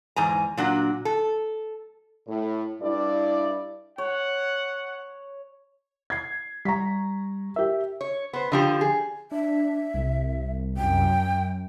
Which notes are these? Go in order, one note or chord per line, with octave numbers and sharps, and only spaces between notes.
E2 G#2 G#5 A#5
A#2 F#3 D4 F#4
A4
A2
G2 E4 D5
C#5 F#5
G#6 C7
G3 A#5 C#6 B6
G4 A#4 E5
C#5
B3 C5
D3 F3 G4
G#4
D4 E5
C2
F#2 G5